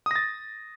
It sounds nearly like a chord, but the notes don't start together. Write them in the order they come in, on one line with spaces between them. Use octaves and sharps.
D#6 A#6 A6